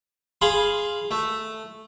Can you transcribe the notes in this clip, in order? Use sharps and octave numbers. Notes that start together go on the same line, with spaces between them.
G#4 F5 B5 C6
A3